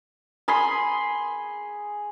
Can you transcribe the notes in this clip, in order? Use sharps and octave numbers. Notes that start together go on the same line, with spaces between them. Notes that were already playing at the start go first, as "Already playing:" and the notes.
G#4 G#5 B5 C6